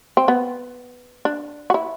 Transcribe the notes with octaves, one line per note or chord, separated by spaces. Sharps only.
C4
B3
D4
F#4
E4